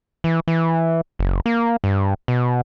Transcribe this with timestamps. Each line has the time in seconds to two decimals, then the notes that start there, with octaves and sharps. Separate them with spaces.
0.24 E3
0.48 E3
1.19 F#1
1.46 A#3
1.84 G2
2.28 B2